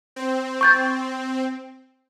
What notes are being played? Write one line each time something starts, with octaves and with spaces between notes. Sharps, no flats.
C4
C#6 G6 A6